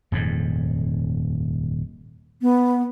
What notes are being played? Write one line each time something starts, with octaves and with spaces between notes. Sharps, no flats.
D#1 F2 G#2
B3